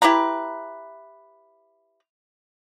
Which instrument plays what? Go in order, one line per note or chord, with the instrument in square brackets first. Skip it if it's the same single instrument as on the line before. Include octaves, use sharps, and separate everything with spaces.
[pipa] E4 G4 B4 A#5